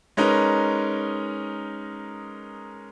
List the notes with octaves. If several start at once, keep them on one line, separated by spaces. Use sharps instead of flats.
G#3 C#4 D#4 A#4 B4